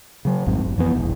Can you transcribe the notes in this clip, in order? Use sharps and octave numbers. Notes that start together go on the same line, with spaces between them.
C#3 F#3
A1 F2 G#2
F#1
F2 E3 B3
E1 A#1 E2